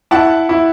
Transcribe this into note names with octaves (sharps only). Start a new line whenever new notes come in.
E4 F#5 A5
E4